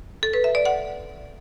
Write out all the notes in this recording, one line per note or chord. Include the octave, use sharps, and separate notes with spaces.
A4
B4
E5
D5
F#5